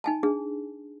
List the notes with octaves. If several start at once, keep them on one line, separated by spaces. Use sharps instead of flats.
D#4 G#5 A5
D4 G#4